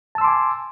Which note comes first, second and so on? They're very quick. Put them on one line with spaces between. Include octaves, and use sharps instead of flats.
A5 E6 C6 D6 G#5